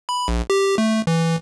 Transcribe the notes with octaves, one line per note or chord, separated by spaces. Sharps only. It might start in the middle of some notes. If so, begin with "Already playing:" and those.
B5
A#1
G4
A3
E3